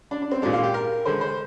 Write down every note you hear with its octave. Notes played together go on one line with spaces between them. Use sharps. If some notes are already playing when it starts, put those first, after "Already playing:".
D4
D4
C4
A#2 G#3 D4
F4
G4
A#4
D3 G#3 C5
C5